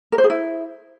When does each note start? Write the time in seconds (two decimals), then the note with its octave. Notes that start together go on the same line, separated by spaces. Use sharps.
0.12 A#4
0.18 C5
0.24 G#4
0.30 E4